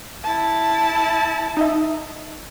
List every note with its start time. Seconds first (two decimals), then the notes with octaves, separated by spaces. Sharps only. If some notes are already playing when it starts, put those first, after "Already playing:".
0.23 E4 A5
1.57 D#4 D#5 E5